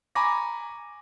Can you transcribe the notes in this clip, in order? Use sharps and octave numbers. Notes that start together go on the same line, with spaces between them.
G#5 A#5 B5 C#6 D6 A#6